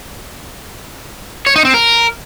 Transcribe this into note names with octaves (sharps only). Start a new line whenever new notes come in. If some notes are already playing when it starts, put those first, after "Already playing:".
C#5
D#4
C4
A#4